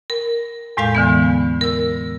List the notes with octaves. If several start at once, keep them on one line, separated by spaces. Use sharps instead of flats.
A#4
E2 A2 G#3 F5 G#5 G6
D3 E3 B3
A#4 E6